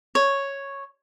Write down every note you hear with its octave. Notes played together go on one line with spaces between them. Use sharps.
C#5